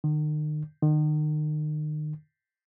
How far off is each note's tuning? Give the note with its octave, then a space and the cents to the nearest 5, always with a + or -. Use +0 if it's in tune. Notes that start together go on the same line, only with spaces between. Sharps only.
D#3 -45
D#3 -40